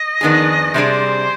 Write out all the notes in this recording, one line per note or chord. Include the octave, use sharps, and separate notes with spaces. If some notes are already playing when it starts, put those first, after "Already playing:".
Already playing: D#5
F2 D#3 B3 D4 G#4
C3 G3 D4 G#4 C5 D5